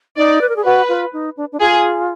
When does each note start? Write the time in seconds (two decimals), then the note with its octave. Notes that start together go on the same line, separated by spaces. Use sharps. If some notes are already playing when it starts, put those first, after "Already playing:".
0.17 D#4 D5
0.41 B4
0.49 A#4
0.56 G#4
0.64 F#4 B4
0.89 F4
1.13 D#4
1.37 D4
1.52 D4
1.60 F4 G#4